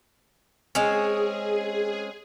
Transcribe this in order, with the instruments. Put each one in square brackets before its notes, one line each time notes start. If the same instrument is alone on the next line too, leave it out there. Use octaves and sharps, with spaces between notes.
[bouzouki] G#3 C4 C#4 [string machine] G#4